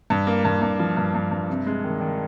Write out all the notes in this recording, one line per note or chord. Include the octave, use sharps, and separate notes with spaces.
G2
A#3
G2
G2
F3
G2
G2
G2
C3
G#3
D#3
D#3